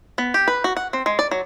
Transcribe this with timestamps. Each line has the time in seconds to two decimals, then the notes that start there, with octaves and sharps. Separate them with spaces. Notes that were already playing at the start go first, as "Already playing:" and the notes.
0.18 B3
0.34 G4
0.48 B4
0.64 F#4
0.77 F#5
0.93 C4
1.06 G#3
1.19 D5
1.31 F#3